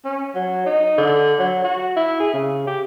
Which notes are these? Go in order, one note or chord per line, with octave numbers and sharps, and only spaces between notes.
C#4
F#3
D#4
D3
F#3
F#4
E4
G#4
C#3
G4